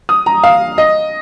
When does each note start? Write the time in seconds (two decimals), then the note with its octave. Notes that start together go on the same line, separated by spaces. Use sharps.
0.09 D#6
0.26 A#5
0.43 F5
0.78 D#5